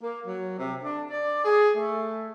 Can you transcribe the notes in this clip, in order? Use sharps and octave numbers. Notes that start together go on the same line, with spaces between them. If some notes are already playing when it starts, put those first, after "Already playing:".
A#3
F#3
C3
D4
D5
G#4
A3